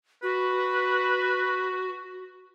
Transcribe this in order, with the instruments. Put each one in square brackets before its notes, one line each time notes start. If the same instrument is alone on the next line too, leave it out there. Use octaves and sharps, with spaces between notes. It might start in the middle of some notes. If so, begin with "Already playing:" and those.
[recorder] F#4 [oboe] B4